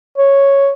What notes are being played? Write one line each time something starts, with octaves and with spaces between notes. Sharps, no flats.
C#5